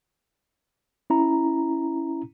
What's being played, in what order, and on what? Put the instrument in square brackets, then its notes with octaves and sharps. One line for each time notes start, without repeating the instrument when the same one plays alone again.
[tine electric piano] C#4 E4 A#5